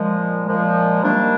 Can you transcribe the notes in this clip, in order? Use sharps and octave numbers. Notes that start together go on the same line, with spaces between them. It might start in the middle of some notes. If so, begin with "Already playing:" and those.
Already playing: A#2 F3 G#3
A#2 F3 G#3
C3 D#3 G3 A#3 D4